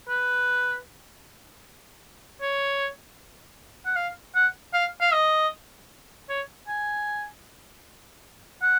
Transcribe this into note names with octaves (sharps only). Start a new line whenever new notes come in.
B4
C#5
F#5
F5
F#5
F5
F5
D#5
C#5
G#5
F#5